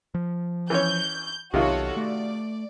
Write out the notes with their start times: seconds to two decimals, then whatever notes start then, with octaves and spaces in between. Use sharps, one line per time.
0.14 F3
0.70 E3 C#4 C#5 G6
1.54 B1 C3 D#3 F4 F#4 A4 C#5
1.97 A3 D5